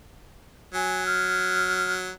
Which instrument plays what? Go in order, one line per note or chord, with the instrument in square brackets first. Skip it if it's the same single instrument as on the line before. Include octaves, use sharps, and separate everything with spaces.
[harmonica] F#3 [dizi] G#5
[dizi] F6